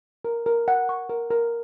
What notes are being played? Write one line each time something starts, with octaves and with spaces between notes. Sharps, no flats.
A#4
A#4
F#5
C#6
A#4
A#4